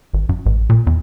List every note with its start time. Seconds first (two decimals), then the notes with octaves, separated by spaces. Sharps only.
0.13 G#1
0.29 F#2
0.46 A1
0.70 A#2
0.87 E2